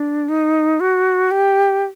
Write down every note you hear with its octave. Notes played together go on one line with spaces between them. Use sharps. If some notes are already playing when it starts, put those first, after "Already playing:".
Already playing: D4
D#4
F#4
G4